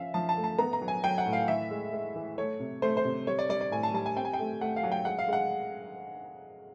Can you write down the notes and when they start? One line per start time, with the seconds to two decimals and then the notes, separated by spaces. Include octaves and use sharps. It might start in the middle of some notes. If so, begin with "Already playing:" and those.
Already playing: F3 C#4 E5 F5
0.14 F3 A5
0.29 A5
0.37 A3
0.44 A5
0.58 B3 A#5
0.73 A#5
0.82 F#3
0.88 G#5
1.04 F#3 G5
1.18 F#5
1.26 A2
1.33 F5
1.48 E3 E5
1.71 G#3
1.93 G#3
2.16 E3
2.38 A3 C#5
2.60 C3
2.82 A3 C5
2.97 C5
3.05 C3
3.27 G3 C#5
3.39 D5
3.49 G3 D5
3.61 D5
3.71 A2 G#5
3.83 A5
3.94 G3 A5
4.06 G#5
4.16 C4 G5
4.25 G#5
4.33 G5
4.39 A3
4.61 A3 F#5
4.76 F5
4.83 F#3
4.92 G5
5.05 G#3 F#5
5.19 F5
5.28 G#3 F#5